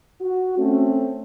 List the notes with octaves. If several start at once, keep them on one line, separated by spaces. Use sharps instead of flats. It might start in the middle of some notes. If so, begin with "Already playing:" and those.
F#4
A3 C4 C#4